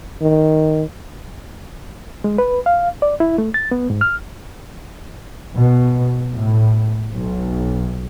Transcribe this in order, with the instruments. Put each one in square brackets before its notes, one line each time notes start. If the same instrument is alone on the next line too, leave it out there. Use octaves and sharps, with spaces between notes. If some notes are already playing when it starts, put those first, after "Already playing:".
[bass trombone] D#3
[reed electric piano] G#3
B4
F5
D5
E4
A3
A6
B3
G#2
F6
[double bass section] B2
A2
B1